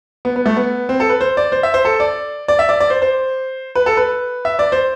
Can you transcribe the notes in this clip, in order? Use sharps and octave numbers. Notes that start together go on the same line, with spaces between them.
B3
B3
A3
B3
C4
A4
B4
C5
D5
C5
E5
C5
A4
D5
D5
E5
D5
D5
C5
C5
B4
A4
B4
E5
D5
C5